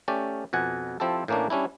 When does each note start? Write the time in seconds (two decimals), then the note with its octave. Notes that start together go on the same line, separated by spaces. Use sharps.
0.08 A3 C#4 G4 D5
0.53 F2 B2 F#5 G#5
1.00 F3 C4 E4 G4 A4
1.28 A2 E3 A#3 C#4 D4
1.50 G3 C#4 D4 E4